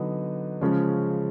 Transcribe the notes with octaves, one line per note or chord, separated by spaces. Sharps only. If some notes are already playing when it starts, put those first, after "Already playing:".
Already playing: D3 F#3 B3 D#4
C#3 F3 G#3 C#4